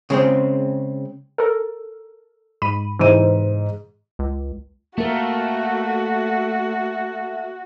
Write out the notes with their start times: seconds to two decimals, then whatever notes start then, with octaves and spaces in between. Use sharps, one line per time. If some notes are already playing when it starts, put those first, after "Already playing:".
0.10 C#3 G#3 C4
1.38 A4 A#4
2.62 G#2 B5 D#7
2.99 G#2 C3 E3 C5 D#7
4.19 C#2
4.98 A3 A#3 F#4 A#4